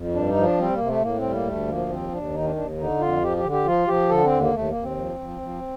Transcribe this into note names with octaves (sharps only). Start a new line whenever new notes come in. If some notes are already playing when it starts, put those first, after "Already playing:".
Already playing: F2
G2 D4
D#4
F3
D4
G3 C4
A#3
C3
A3
A2 A#3
C4
G3
A#3
D2 A3
F3 A#3
D#2 C4
D#2 D4
D#3 D#4
D4
D#2 D4
D3 D#4
F2 F4
F3 G4
G4
D3
G4
F3 F4
F3 G4
D3 A4
C4
D#2
A#3
D#2 A3
A#3
D#2
C4
F3
F3
F3